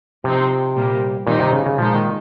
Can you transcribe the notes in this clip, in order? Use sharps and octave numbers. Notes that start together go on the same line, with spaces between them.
C3 F3 C4 D#4
A#2 G3 A#3
A#2 D#3 G3 C4 D#4
C3
C#3
C#3
A#2 F3 G#3 D#4
D#3